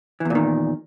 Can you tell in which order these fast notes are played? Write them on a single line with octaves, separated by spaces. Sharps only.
E3 E2 A#2 D#3